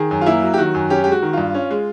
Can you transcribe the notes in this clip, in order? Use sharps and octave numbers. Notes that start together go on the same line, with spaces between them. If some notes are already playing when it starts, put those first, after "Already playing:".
Already playing: D#3 G#4
F#2
F4
A#3 E4
F#3
G4
D#3 F#4
F#2
C#4 G4
G#3 G4
F#4
D#3
G2 F4
C#4
G#3